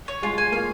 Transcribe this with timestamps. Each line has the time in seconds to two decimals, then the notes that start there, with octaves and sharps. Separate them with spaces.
0.08 C#5
0.22 G#3 F4
0.38 G#5
0.52 A#3 F5